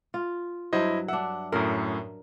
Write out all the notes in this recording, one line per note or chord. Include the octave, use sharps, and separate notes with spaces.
F4
G2 F#3 E4 C5 D#5
D4 E5 F#5
F#2 A2 A#4